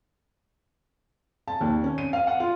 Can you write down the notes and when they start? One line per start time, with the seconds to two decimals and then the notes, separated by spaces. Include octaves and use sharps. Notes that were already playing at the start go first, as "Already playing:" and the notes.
1.48 A5
1.61 D#2
1.84 C#4
1.98 D#7
2.13 F5
2.27 F#5
2.40 F4